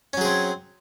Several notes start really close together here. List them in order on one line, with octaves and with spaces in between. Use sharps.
C#4 F#3 G#4 C4